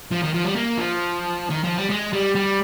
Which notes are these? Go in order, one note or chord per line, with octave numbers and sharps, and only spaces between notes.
F3
D#3
F3
G3
A#3
F3
D#3
F3
G3
G#3
G3
G3